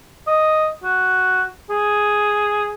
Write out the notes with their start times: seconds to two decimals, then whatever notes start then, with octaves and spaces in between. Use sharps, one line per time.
0.27 D#5
0.84 F#4
1.70 G#4